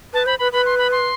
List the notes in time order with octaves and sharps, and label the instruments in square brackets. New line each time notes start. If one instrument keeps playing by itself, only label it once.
[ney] B4 [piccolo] A5
[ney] C5 [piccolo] B5
[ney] B4 [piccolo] B5
[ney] B4 [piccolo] B5
[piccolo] C6
B5
C6